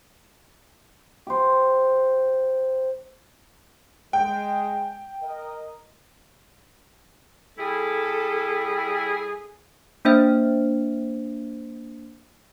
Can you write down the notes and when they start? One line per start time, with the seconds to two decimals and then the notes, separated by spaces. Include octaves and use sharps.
1.27 G4 C5
4.13 G#3 G5
5.22 A#4 D#5
7.59 G3 E4 G#4 A4
10.05 A#3 D4 C5 E5